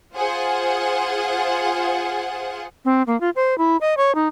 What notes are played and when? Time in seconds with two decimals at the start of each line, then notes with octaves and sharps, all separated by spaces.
0.15 F4 G#4 C5 F#5
2.85 C4
3.07 A#3
3.20 F4
3.36 C5
3.58 E4
3.81 D#5
3.97 C#5
4.15 D#4